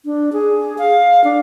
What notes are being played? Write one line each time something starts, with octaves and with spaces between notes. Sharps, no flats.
D4
G#4
F5
D4